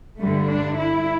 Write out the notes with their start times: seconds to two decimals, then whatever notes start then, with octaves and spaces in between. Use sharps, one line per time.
0.19 G2 D3 G3 A3
0.49 D4
0.78 E4